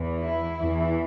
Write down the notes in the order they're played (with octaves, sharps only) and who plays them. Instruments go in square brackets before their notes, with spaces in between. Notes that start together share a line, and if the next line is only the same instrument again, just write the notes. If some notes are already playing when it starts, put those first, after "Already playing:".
Already playing: [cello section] E2 E3
E4
E2 E3